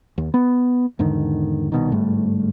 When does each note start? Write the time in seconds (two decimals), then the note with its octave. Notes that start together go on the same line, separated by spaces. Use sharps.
0.18 D#2
0.34 B3
0.99 E2 G#2 D3 D#3
1.72 C2 B2 D#3
1.92 G1 G#2 G3 A3